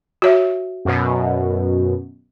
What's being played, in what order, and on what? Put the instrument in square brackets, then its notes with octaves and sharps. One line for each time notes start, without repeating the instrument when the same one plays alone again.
[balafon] F#4 C#5 E5
[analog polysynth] F#2 B2